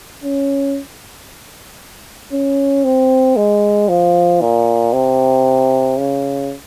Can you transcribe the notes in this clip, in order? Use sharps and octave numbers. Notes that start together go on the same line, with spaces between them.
C#4
C#4
C4
G#3
F3
A#2
C3
C#3